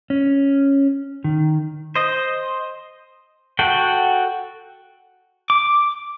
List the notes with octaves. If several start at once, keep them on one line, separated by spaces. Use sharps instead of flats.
C#4
D#3
C5 D#5
F#4 A4 G5
D6